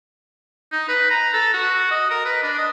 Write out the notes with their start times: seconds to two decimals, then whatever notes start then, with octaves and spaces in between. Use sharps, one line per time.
0.72 D#4
0.88 B4
1.10 A#5
1.33 A4
1.54 F#4
1.91 D#5
2.10 A#4
2.25 B4
2.43 D4
2.58 D#5